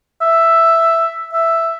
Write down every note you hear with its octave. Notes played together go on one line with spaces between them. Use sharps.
E5
E5